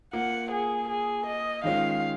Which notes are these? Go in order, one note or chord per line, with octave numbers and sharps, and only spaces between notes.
A#3 F4 A#4 F#5
G#4
G#4
D#5
D#3 G#3 C#4 F4 F5